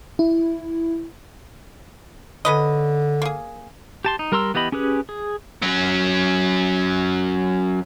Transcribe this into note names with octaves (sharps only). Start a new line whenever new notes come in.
E4
D3 C#4 B4 D#5
A#3 G#4
G4 A5 C6
D#4
G3 A#4 A#5 C6 E6
E3 B3 G4 D#5 B5
C#4 G4 G#4 B4
G#4
F#3 C#4